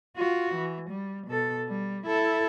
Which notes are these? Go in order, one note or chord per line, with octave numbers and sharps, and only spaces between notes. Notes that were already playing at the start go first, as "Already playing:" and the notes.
F4 F#4
E3
G3
B2 A4
G3
E4 A4